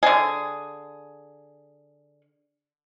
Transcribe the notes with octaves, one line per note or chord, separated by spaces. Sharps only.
D3 G#4